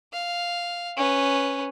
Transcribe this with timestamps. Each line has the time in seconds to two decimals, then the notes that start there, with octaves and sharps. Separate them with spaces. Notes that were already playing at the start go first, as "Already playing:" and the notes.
0.13 F5
0.97 C#4 B4